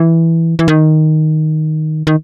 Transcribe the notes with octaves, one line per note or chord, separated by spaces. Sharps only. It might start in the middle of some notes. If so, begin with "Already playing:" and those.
Already playing: E3
E3
D#3
D#3